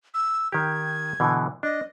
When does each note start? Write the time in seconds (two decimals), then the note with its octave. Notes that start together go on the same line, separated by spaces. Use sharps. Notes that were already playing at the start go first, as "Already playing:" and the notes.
0.14 E6
0.52 D#3 G4 G#6
1.20 B2 D3 E3
1.63 D4 D#5